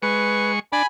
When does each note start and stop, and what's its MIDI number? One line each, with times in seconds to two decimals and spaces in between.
0.02 0.59 56
0.02 0.52 71
0.02 0.59 85
0.72 0.83 62
0.72 0.86 80
0.72 0.86 83